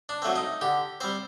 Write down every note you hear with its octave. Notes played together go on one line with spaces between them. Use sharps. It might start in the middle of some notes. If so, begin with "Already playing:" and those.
D4
F#3 A3 C4
D#4
D3 G4
G3 C4 C5